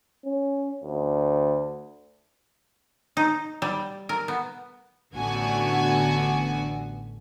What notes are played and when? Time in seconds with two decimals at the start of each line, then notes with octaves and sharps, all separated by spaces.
0.25 C#4
0.83 D2
3.17 D#4
3.62 G3
4.09 A#4
4.28 B3
5.13 A1 D3 B3 F#4 G#5